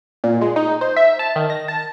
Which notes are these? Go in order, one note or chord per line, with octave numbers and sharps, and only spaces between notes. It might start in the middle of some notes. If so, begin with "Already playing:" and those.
A#2
G#3
D#4
C5
E5
A5
D#3
A#6
A5